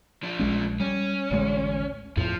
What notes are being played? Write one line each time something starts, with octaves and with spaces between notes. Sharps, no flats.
F3 D4
A#1 G#3 C#4
G3 C#4
A1 D2 G#3
E2 A2 F3